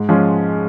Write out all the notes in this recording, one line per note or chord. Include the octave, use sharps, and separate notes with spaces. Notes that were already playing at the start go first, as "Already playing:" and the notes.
Already playing: G#2
F3 G#3 C#4